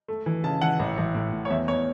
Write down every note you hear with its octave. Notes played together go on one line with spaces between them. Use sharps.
A3
E3
C#3 A5
E3 F#5
A1
A1
A2
A2
C#5
E2 E5
E2 C#5